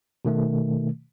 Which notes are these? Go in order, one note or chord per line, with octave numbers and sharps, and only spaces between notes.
B2 D#3 A3